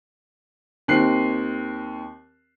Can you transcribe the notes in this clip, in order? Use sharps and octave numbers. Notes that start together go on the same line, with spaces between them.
D#2 C4 F#6 C7